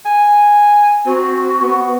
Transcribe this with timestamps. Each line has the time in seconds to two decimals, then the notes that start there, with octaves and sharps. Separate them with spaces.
0.05 G#5
1.06 C4 F#4
1.62 B3